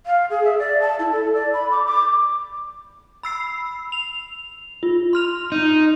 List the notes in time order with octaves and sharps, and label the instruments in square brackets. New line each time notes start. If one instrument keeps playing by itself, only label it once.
[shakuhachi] F5
G#4
E5
D5
A5
E4
A4
D5
B5
D6
D6
[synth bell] B5 E6 C7
F7
F4
C6 F6 F7
[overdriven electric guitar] D#4